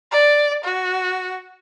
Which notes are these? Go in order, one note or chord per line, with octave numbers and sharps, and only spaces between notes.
D5
F#4